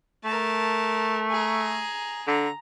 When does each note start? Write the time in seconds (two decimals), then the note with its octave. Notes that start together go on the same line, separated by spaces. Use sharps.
0.24 A3 A#4 A5
1.30 G#4 A#5
2.27 D3 A#5